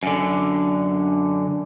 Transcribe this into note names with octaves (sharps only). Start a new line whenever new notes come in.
F#2 D3